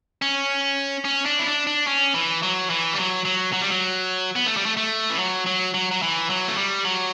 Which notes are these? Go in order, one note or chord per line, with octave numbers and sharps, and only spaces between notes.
C#4
C#4
D4
E4
D4
D4
C#4
E3
F#3
E3
G3
F#3
F#3
F#3
G3
F#3
B3
A3
G3
A3
A3
E3
F#3
F#3
F#3
F#3
E3
F#3
A3
G3
F#3